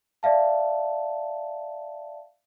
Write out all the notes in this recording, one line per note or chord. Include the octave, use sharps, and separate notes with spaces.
D5 E5 F5 A5